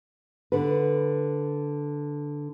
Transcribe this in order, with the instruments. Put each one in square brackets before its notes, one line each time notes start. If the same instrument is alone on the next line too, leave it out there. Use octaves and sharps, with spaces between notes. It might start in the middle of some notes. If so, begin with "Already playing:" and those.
[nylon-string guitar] D3 B4